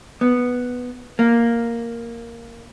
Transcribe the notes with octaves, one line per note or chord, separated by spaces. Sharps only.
B3
A#3